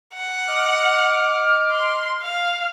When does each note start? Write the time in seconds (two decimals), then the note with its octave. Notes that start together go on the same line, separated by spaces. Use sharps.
0.14 F#5
0.48 D#5 D6 F6
1.71 C6
2.23 F5